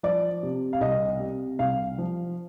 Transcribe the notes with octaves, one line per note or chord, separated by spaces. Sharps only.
F3 D5
C3
F5
C2 D#5
C3
C2 F5
F3